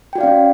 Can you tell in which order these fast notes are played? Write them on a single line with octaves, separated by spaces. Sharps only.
G5 F#4 D5 F5 C#4